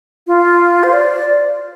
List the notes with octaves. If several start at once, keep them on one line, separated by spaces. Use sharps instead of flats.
F4
C5
D5